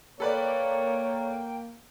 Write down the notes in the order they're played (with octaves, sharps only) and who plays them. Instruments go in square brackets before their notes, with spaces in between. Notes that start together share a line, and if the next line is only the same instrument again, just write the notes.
[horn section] A#3 [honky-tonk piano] A4 B4 D5 [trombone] C#5 [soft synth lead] G5